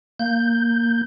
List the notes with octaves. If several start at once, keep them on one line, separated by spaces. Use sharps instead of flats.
A#3 G6